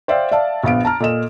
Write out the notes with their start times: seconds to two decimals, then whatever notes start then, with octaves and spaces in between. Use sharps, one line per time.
0.08 C5 D5 E5 F5 G5
0.32 D5 E5 F5 A5
0.64 A#1 B3 F5 D7
0.85 A5 A#5 F6
1.00 A#2 A4 D#5 E7